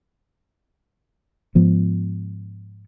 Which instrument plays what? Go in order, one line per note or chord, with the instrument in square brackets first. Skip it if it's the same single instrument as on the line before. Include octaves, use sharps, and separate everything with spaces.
[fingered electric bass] G#2 F3 B3